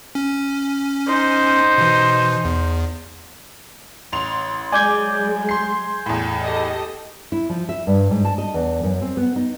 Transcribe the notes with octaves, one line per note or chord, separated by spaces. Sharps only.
C#4
D#4 C5
B2 E3
E2
A1 C6 F7
F#3 G#3 D5 G#5 D6 G6 G#6
C6 C7
E2 A2
G4 A4 D#5
E4
F3
E5
G2
G#2
A5
D#5
E2
F#2
C4
B3
D#4